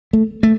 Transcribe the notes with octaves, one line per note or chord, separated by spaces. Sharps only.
A3
A3